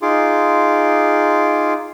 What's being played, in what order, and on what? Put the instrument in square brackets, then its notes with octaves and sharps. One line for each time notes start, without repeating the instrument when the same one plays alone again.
[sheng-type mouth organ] D#4 F4 G#4 C6 D6